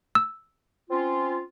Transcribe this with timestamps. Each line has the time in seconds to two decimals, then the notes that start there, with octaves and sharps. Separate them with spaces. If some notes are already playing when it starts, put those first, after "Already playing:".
0.15 E6
0.90 C4 C#4 F4